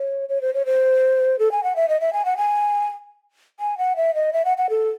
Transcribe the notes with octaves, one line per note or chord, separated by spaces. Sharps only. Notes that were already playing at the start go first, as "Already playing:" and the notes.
Already playing: C#5
C#5
C5
C#5
C5
A4
G#5
F#5
E5
D#5
E5
G#5
F#5
G#5
G#5
F#5
E5
D#5
E5
F#5
F#5
A4